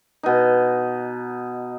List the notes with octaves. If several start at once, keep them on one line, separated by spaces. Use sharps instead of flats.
B2 D#4